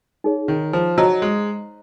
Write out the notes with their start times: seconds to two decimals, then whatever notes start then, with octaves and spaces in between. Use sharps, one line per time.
0.24 D#4 G#4 C#5
0.48 D#3
0.73 F3
0.98 F#3 C5 D#5 A#5 C#6
1.22 G#3